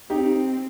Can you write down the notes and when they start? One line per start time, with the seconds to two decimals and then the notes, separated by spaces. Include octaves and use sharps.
0.10 C4 D#4 G4